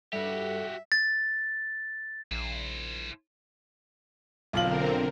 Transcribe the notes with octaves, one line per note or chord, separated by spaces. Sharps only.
G2 G3 F#4 G4 A4 E5
A6
A#1 E4 C5
B1 D3 C4 F4 A#4 F#7